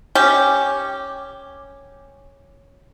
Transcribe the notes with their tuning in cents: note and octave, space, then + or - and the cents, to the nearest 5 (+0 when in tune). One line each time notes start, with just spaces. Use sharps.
C#4 -5 G4 +0